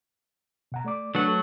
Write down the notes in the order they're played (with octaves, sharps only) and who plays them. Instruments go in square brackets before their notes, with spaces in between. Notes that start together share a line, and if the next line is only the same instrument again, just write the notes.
[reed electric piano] B2 F#5 A#5
A3 D5 D6
[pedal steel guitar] F#3 A3 F#5 [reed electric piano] D4 B4
[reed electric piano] A4